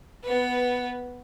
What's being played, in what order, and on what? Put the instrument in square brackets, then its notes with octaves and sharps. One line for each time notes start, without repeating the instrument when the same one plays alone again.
[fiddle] B3 B4